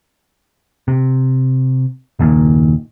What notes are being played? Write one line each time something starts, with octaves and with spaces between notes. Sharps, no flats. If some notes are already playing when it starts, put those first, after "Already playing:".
C3
F#1 D#2 A#2 D#3